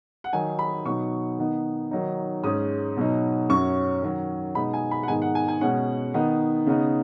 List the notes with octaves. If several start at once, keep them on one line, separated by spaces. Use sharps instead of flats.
F#5
D#3 F#3 D#4 G#5
B5
B2 F#3 B3 D#4 C#6
D#3 B3 D#4
D#3 F#3 D#4
G#2 G#3 C#4 D#6
B2 F#3 D#4
F#2 F#3 C#4 C#6
D#3 F#3 C#4
B2 G#3 B3 D#4 B5
G#5
B5
F#5
G#2 D#3 B3 D#4 G#5
F#5
G#5
G#5
B2 G#3 C#4 F#5
D#3 B3 D#4
C#3 B3 D#4